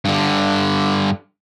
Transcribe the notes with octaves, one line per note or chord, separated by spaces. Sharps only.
G2 D3